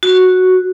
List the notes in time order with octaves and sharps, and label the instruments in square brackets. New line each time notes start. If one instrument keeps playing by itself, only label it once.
[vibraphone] F#4